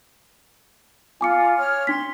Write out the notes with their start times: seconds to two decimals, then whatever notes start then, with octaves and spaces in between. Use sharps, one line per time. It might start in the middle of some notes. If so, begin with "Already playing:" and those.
1.21 F4 G#5 D6 C#7
1.57 C#5 F6
1.87 D4 C6 B6